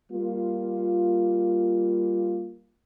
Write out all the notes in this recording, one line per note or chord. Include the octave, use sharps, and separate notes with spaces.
G3 A#3 F4